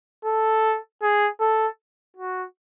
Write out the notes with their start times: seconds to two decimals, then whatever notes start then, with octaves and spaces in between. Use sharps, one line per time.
0.25 A4
1.02 G#4
1.40 A4
2.17 F#4